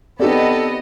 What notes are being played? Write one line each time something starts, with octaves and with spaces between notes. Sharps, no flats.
B3 C4 D#4 G4 A4 D5 D#5